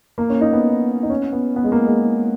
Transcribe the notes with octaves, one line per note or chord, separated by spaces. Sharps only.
A#3
C#4
D#4
B3
D#4
C#4
B3
B3
G#3
A#3
G#3